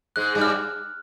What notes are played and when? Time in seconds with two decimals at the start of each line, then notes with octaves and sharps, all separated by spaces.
0.16 G#2 G#3 F#6
0.35 G2 G3
0.41 F6